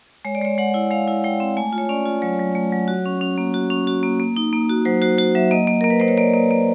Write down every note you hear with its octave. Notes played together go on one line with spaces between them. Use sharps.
G#3 C#5
D5
G#3 C#5
G#3 F#5
E4
G#3 F5
E4
G#3 G5
C4
A3 G#5
F4
C#5
C#4 D5
F4
F#3 C#5
F#3
A3
F#3
F#4
C#4
C#4
A#3
F#4
C#4
F#4
A#3
A#3
D#4
A#3
F#4
F#3 C5
F#4 C5
F#4 C5
F#3 E5
A#3 D#5
A#3
A#3 A#4
B4
A#3 C5
C#5
A#3 D5
A#3
A#3